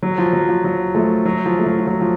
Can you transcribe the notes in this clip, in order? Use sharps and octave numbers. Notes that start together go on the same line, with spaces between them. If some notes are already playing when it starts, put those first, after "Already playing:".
F#3
F3
F#3
F3
F#3
F3 A3
F#3
F3
A3
F#3
F3
F#3
F3